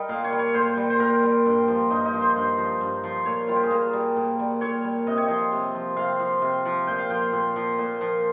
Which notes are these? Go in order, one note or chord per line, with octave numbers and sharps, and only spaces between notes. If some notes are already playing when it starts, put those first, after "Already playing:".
Already playing: G3 A#4 D#5
A#2 F5
C#5
G3
C#5
A#2 C5
G3
C5
A#2 A#4
G3
G2
F3
G2 D#4
D#4
F3
C5
G2
F3
G2
F3
A#2 C#5
G3 F4
G4
G#4
A#2 A#4
G3
A#2
G3
A#2 C#5
G3
C3 D#5
C#5
F3 D#5
C3
F3
C3 F5
F3
C3
F3
A#2 G5
F5
F3 G5
A#2
F3
A#2
F3